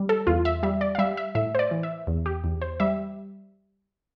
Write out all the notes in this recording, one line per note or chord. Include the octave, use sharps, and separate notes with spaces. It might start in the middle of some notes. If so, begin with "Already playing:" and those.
Already playing: G3
A4
E2 F4
E5
G3 E5
D5
F5
G3 E5
E5
A2 E5
C5
D5
E3
E5
E2
G4
E2
C5
G3 E5